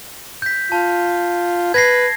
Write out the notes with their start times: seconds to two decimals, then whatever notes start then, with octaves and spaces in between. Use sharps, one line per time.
0.42 G6 B6
0.72 F4 A5
1.74 B4 G#6 A#6 C7